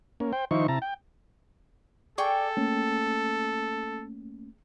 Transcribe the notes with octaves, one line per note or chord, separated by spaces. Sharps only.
A#3 C#4
C5 G5
D#3 F3 D#4 E4 C5 C#6
C3 E4 A5 A#5
G5
G#4 A4 D5 G5 C#6 D6
A3 A#3 C#4